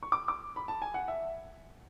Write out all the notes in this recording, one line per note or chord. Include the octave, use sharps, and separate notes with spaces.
C#6
D6
D6
B5
A5
G#5
F#5
E5